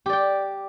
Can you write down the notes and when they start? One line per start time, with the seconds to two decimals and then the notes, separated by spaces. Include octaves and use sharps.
0.06 G4
0.09 D5
0.13 G5